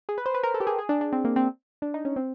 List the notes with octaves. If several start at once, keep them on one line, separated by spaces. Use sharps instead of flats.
G#4
B4
C5
B4
A#4
A4
G4
G#4
G#4
D4
D4
C4
A#3
C4
D4
D#4
C#4
C4